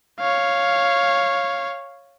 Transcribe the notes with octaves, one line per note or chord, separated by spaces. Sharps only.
C#5 F5